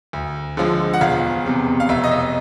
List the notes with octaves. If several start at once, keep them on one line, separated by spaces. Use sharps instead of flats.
D2
D3 F3 G#3
F#5
E1 F5
E2 C3
F5
F1 E5
D#5
E5